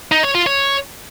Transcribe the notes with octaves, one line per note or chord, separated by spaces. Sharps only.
D#4
C#5
F4
C#5